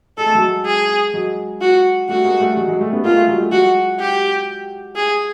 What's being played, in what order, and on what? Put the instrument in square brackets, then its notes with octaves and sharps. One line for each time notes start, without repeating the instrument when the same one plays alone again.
[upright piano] G#3 [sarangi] A4
[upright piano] A3
F#3 G#3
[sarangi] G#4
[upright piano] F#3 G#3
[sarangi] F#4
[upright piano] G3 A3 [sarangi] F#4
[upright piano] G#3 A#3
G3 A3
F#3 G#3
F#3 G#3
G3 A3
A3 B3
[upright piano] G#3 A#3 [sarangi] F4
[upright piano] G3 A3
F#3 G#3
G3 A3
[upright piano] F#3 G#3 [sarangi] F#4
[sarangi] G4
G#4